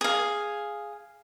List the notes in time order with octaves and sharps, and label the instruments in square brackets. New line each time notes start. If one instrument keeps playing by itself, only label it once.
[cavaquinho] G#4 F5